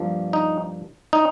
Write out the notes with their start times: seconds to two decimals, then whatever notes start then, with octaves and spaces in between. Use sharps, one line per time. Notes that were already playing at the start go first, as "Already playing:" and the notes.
Already playing: G2 F3 A#3
0.33 D#4
1.13 D#4